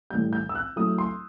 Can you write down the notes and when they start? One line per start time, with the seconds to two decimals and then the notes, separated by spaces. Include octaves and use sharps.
0.10 A2 E3 G3 G6
0.33 G6
0.49 E6
0.55 F#6
0.76 F#3 A3 E4 D#6
0.98 C6